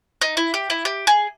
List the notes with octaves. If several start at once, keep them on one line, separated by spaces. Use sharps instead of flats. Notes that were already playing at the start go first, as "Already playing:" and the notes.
D#4
E4
G4
E4
G4
G#4